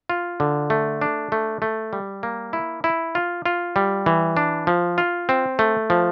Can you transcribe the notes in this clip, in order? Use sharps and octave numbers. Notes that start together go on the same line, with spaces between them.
F4
D3
A3
D4
A3
A3
G3
A#3
E4
E4
F4
F4
G3
E3
D4
F3
F4
C4
A3
F3